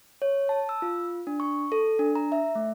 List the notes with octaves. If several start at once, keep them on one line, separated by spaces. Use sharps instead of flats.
C#5
A5
E6
F4
D4
C#6
A4
D4
A#5
E5
A3